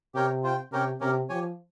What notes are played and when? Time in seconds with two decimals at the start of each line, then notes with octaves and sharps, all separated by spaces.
0.15 C3 G4 A#4 C#5 G5
0.43 F4 C5 G5
0.72 C3 C#4 G4 A#4 C#5 G5
1.00 C3 C#4 G4 A#4
1.29 F3 G4 C#5 G#5